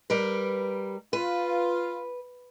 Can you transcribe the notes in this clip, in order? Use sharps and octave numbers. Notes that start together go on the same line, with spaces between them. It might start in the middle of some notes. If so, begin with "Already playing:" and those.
G3 A#4 B4
F4 B4